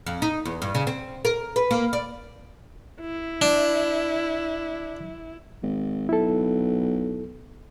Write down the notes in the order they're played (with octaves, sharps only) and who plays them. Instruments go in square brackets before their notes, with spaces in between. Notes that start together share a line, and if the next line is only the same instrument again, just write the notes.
[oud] F2
D#4
E2
G2
C#3
C4
A#4
B4
A#3
D5
[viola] E4
[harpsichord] D4
[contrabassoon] G#1
[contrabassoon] B1 [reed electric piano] E4 A4